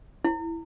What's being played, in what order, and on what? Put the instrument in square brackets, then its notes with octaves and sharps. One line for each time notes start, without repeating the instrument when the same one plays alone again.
[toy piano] E4